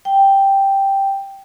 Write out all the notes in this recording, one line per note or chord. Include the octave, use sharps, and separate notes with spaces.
G5